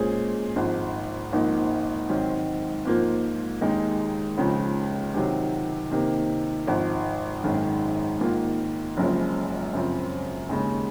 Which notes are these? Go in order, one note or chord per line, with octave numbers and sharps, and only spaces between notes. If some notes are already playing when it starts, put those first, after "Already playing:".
Already playing: A#2 G#3 C#4 G#4 C5
G#1 G#2 F3
G#1 G#2 F3 A#3 D#4
G#2 D#3 F#3 C4
G#2 F3 A#3 F4 C5
D#2 D#3 G#3 D#4
C#2 C#3 F3
C3 D#3 F#3
C3 D#3 A#3
G#1 G#2 F3
G#1 F#2 D#3 G#3
G#2 D#3 A#3 F4
F#1 F#2 C#3 F3 G#3
F#2 C#3 F3 C4
D#2 C#3 G#3